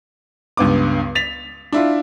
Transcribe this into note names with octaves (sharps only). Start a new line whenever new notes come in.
C#2 G2 B3 D6
A6 B6 F7
D4 E4 F4